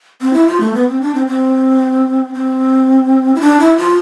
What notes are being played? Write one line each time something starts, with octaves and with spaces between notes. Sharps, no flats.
C4
E4
F4
A3
B3
C4
D4
C4
C4
C4
E4
D4
E4
F4